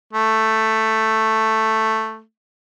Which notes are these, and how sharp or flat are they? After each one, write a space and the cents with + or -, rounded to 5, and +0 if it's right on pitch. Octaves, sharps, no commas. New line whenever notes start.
A3 +5